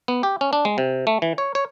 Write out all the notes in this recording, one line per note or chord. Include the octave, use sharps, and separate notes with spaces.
B3
G4
C#4
D4
G#3
C3
A3
E3
C#5
C#5